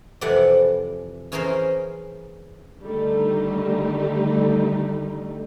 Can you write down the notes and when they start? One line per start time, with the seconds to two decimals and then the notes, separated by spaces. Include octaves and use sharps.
0.21 F2 C3 E3 D5 F#5
1.32 E3 C#4 G#4 A#4 C5 C6
2.82 D3 D#3 G3 A3 D#4